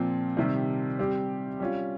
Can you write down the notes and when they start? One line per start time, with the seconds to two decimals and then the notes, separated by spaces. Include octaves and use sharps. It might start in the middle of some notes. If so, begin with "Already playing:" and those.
Already playing: A#2 F3 C4
0.37 C3 D#3 G3 C4
0.99 G3 C4 G4
1.60 G3 C#4 F4